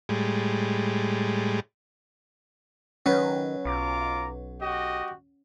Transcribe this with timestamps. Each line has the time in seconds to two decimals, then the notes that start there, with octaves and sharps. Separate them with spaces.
0.09 A2 G3 G#3
3.06 D#3 F#3 C#4 B4
3.65 B1 F4 A#5 D6
4.61 F#4 G4 D#5